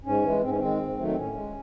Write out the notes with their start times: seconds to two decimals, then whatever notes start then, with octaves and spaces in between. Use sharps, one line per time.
0.05 G#2 C#4
0.23 E3 G#3
0.42 G#2 C4
0.49 C#4
0.58 D#3 G#3 C4
0.79 G#2
0.97 D#3 F#3 A3
1.07 C4
1.16 A2 C#4
1.35 G#3